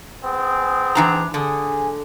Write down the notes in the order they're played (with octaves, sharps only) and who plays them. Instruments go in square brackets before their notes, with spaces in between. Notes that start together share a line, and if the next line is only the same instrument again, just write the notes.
[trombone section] B3 C4 G#4
[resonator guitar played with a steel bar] E3 D4 A#5
[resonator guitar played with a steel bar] D3 [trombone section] G#4